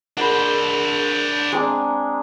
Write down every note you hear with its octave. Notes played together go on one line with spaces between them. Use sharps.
D4 G#4 A#4 C5 F#5 B5
G#3 C4 D4 G#5 A#5